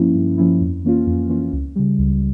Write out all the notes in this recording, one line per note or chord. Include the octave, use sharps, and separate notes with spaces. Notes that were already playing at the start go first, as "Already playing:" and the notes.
Already playing: G2 F3 A#3 C#4 E4
G2
F3 A#3 C#4 E4
F2
E3 A#3 C#4 F4
F2
E3 A#3 C#4 F4
C#2
C#3 G3
C#2